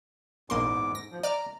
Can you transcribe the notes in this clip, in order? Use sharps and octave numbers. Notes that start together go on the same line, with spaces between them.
A#1 E2 G#2 A#3 C6 D6
A#6
F3
D5 A#5 D6 F6